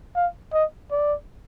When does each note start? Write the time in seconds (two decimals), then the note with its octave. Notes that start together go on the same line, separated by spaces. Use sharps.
0.16 F5
0.53 D#5
0.91 D5